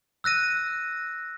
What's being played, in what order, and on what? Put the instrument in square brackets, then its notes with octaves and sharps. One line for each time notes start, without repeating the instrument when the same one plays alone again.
[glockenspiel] E6 F#6 A#6 D#7